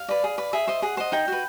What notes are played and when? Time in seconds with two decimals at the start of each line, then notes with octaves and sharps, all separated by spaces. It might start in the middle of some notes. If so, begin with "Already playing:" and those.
Already playing: F5
0.09 B4 D5
0.24 G#4
0.38 B4 D5
0.53 G#4 E5
0.68 C5 D#5
0.82 G#4 F#5
0.97 C5 D#5
1.12 D#4 G5
1.28 F#4 B4